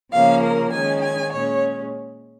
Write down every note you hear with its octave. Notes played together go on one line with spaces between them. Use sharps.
C#3 F3 A#3 C#4 F5
A#4
D#3 G#3 C#4 G#5
G#5
A#2 G#3 C#4 C#5